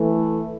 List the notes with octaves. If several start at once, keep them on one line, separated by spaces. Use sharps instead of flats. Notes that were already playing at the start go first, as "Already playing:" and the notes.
Already playing: E3 A3